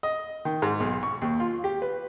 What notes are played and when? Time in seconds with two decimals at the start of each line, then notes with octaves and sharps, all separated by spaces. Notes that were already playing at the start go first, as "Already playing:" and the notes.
0.03 D#5
0.45 D#3
0.62 G#2
0.80 B1
1.03 C#6
1.22 D#2
1.40 F4
1.64 G4
1.82 B4